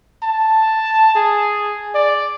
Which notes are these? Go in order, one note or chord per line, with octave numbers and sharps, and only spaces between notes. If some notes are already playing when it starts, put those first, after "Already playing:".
A5
G#4
D5